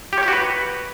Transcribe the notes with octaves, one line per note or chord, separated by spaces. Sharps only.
G4
C#5
G4
F#4
B4